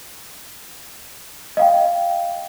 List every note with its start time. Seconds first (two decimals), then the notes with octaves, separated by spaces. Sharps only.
1.57 D#5 F5 G5